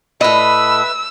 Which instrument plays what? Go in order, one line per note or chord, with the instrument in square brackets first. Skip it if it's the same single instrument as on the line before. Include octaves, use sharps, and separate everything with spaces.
[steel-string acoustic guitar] A2 D#5 [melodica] B4 E5 [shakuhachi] B5 [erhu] E6